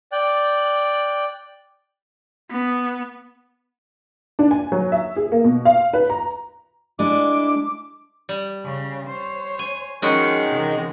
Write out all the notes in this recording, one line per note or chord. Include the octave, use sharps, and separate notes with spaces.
D5 G5 F#6
B3
D4
G#5
F#3
E5
G#4
A#3
B2
F5
B4
A#5
G#3 D4 E4 D6
G3
C#3
C5 C#5
G#5
D#3 F3 G#3 C#4 F#4 G5
C3 E3